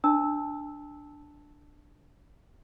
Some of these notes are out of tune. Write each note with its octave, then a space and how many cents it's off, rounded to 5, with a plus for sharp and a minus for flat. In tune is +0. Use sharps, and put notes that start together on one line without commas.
D4 +0 A5 +0 E6 -15